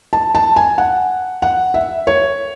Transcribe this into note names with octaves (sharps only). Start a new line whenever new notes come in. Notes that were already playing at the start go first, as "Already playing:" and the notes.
A5
A5
G#5
F#5
F#5
E5
C#5